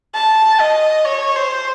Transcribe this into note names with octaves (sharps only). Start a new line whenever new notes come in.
A5
D#5
C#5
C5